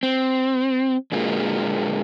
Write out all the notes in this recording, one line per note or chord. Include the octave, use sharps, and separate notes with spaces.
C4
A#2 D3 G#3 A#3 F4 F#4